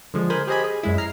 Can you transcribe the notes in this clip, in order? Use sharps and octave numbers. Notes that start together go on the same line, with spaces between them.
D3 F3 G#3
A#4 C5 G#5 B5
G4 G#4 C5 D#5 G#5 B5
G#4
F#2 G#3 E4
A#5 F6 C7